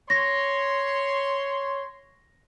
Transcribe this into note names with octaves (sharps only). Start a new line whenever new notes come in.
C#5 C6 A#6